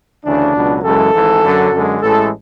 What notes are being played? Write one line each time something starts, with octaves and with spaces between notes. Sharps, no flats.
D2 C#3 E3 D4
C#2 B2 F#3
F#2 C#3 E3 G#3 A4
G#1 G#2 E3
F#2 D3 F#3
F#2 D3 G#3
A1 A2 E3 G#3 A4